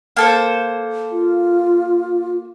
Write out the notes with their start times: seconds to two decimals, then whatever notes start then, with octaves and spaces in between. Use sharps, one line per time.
0.16 A#3 A4 C5
1.12 F4